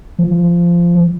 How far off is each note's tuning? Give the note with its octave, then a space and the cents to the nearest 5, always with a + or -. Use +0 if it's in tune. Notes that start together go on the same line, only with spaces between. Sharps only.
F3 -15